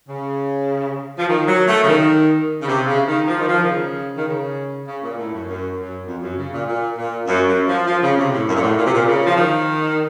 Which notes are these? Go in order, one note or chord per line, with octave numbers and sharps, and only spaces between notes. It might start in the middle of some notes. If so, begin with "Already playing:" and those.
C#3
F3
D#3
F#3
A3
C#3
D#3
C#3
C3
C#3
D#3
F3
D#3
F3
D#3
C#3
D#3
C#3
C#3
A#2
A2
F#2
F#2
F#2
F2
F#2
C#3
A#2
A#2
A#2
F#2
F#2
F3
F3
C#3
C3
A2
F#2
A#2
A2
A#2
C3
A#2
C#3
F3
D#3